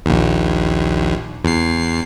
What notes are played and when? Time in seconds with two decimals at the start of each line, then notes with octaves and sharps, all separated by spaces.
0.06 A#1 D#2
1.45 E2 C7